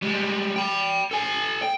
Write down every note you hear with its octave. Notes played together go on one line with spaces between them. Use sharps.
G3 G#3
G5 B5
A4 G#5
G5